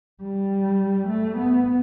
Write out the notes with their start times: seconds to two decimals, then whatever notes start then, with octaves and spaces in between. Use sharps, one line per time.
0.23 G3
1.09 A3
1.38 B3